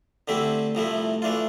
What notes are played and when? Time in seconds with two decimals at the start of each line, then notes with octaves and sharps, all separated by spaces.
0.28 D3 A3 C4 E4 G4
0.75 C2 C3 F3 A3 E4
1.22 E3 A3 D4 F4